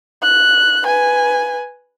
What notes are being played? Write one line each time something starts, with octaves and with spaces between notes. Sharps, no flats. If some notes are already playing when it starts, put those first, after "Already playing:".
F#6
B4 G#5